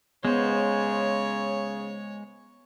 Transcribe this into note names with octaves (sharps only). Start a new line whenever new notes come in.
C#3 G#3 B3 C5 C#5